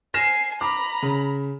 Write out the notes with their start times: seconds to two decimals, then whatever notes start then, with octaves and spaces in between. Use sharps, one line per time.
0.14 G#5 F6 A#6 C7 E7
0.61 A#5 B5 D6
1.03 C#3